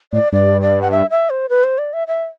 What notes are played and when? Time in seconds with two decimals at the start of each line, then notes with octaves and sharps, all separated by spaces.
0.13 A2 D5
0.32 G2 D5
0.61 D5
0.82 F#5
0.91 E5
1.10 E5
1.30 C5
1.49 B4
1.64 C5
1.78 D5
1.93 E5
2.08 E5